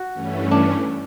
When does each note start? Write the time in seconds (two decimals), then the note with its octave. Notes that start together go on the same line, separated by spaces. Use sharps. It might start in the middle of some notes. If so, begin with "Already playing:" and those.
Already playing: F#4
0.13 G2 E3 A3 C#4
0.51 D4